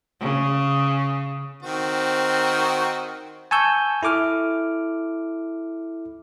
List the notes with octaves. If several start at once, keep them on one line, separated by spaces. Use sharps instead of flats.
C#3
D#3 C4 F#4
G#5 A5 C#6 E6 G6
E4 A4 D6 F6